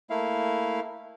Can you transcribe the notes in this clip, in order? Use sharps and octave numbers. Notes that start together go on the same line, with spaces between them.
A3 A#3 E4 F5